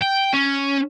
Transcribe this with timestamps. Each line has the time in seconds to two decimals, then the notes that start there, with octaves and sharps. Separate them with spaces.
0.02 G5
0.34 C#4